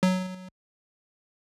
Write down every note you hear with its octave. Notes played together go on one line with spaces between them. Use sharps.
F#3